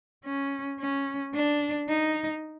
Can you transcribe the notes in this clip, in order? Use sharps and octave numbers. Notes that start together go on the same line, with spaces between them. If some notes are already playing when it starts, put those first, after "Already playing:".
C#4
C#4
D4
D#4